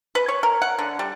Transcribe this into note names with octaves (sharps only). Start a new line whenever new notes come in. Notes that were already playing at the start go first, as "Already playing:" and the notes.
B4
C#5
A#4
F#5
D3
G3